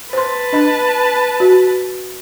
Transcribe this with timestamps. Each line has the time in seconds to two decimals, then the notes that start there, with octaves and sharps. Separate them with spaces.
0.13 B4 C5 A5 C6
0.53 D4 D#5 B5
1.40 F#4